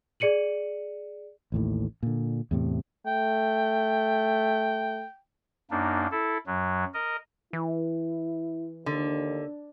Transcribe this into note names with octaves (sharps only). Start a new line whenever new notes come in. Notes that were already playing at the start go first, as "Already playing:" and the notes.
G#4 D5 C#7 D#7 F#7
A1 D#2 A2
A#2 D3
E2 A2 C3
A3 G5
F#2 A#3 D4 D#4
E4 A4
F#2 F#3
A#4 D#5
E3 E4
D#2 D3